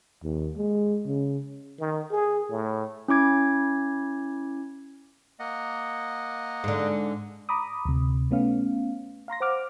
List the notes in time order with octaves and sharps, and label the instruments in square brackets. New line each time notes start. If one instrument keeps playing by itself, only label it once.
[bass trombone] D#2
G#3
C#3
[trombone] D#3
G#4
A2
[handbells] C#4 E4 D6 G#6
[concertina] A#3 D#5 F#5
[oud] G#2 D3
[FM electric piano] A#5 B5 D6 D#6
D2 C3
A3 B3 C#4 F5
F5 A#5 C6 A#6
C5 F#5 D6 F6